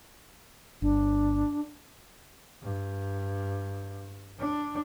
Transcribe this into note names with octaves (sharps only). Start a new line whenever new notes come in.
G1 D4
G2
D4